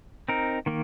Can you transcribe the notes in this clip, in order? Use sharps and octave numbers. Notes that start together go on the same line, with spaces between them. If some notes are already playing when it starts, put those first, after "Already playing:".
C4 D#4 A#4
D#3 A#3